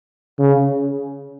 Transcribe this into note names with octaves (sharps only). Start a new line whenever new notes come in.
C#3